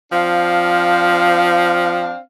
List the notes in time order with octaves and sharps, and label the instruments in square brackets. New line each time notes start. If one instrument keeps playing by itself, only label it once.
[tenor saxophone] F3 [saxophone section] C4 D4 F5